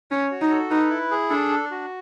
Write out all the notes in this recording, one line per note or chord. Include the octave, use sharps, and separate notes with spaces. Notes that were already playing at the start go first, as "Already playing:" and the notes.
C#4 C#5
F#4
D#4
A4
D#4 B4
E4
G#4
D4 A4
D4
F#4